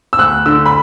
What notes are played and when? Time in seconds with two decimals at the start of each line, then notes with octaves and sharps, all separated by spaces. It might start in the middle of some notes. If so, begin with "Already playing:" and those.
0.13 E6
0.19 D2 F#6
0.46 D3 E6
0.66 B5